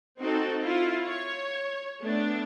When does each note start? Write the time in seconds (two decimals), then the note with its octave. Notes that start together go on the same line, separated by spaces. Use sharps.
0.19 C4 D#4 F#4 A4
0.62 E4 F4
1.05 C#5
2.02 A3 B3 D4